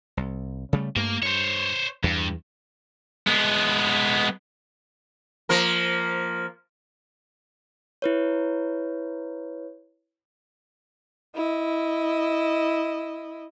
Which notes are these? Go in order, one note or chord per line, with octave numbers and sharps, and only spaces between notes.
C2
C#3 G3 A3
G2 A3 A#3
G2 C5 C#5
E2 G2
G#3 B3
F3 A#3 A#4
E4 B4 C#5
E4 D#5